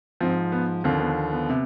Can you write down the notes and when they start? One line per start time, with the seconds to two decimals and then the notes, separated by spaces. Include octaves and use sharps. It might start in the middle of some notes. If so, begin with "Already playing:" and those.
0.20 G#2 F3 C4
0.52 B3
0.84 D#2 D3 F3 C4
1.00 B3
1.32 B3
1.50 C3